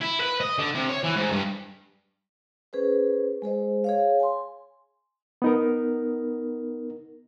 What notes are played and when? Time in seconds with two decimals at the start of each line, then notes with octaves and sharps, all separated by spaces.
0.01 E4
0.20 B4
0.41 D#5
0.58 D3
0.75 C3
0.89 C#5
1.04 E3
1.16 G#2
1.32 G2
2.73 C#4 G#4 B4 C5
3.42 G#3 G#4 C5 D#5
3.84 G#4 C#5 F5
4.20 G#5 C6
5.42 B3 D#4 A#4